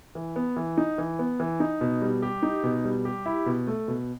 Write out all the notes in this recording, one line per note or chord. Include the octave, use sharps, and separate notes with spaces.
E3
B3
E3
D#4
E3
B3
E3
D#4
B2
G3
G4
D#4
B2
G3
G4
E4
B2
A3
B2